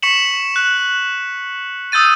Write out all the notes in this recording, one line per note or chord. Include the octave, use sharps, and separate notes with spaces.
C#6 B6 C#7 E7 F#7
F#6
D#6 E6 G6 A6 D#7